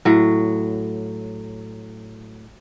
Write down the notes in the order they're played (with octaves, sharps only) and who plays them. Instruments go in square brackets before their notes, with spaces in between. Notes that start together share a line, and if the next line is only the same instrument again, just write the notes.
[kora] A2 F#3